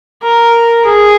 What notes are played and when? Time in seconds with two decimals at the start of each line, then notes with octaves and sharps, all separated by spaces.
0.23 A#4
0.85 G#4